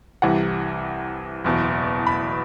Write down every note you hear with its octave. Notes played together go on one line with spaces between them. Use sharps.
C2 C3 E3 F#5
F#1 E2 B2
B5